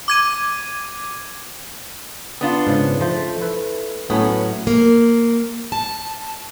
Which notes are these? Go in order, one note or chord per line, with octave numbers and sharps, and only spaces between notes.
D6 G#6 D#7
B3 D4 F4
G#2 C#3
F3 A3 C5
E4 B4
A2 F#3 A3 B3 C#4
A#3
A5